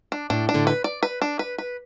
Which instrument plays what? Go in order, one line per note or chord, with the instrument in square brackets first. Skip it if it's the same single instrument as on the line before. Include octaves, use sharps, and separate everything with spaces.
[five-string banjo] D4
[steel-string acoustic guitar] A2 [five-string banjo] D4
[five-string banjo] D4
[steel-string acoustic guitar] A2 D3
[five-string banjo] B4
D5
B4
D4
B4
B4